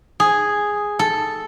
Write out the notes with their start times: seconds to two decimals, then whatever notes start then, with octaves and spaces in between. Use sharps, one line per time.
0.20 G#4
0.99 A4